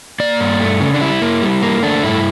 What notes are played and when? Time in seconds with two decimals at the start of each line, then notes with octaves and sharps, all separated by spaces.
0.20 A#3 D5
0.40 G2
0.60 A3
0.80 C#3
0.94 D4
1.00 G3 E4
1.22 A#3
1.42 G3
1.62 A#3
1.83 A3 D4
2.03 G2 E4